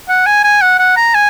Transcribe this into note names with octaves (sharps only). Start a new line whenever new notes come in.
F#5
G#5
G#5
F#5
F#5
A#5
G#5